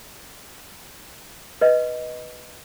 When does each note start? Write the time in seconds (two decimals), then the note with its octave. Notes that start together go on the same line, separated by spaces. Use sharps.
1.61 B4 D#5